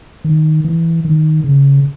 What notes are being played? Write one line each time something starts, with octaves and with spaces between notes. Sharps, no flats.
D#3
E3
D#3
C#3